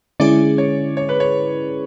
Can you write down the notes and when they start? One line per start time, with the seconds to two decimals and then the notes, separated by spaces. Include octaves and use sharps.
0.20 D3 G#3 C#4 E4 G#4 D5
0.58 C#5
0.97 C#5
1.09 B4
1.20 C#5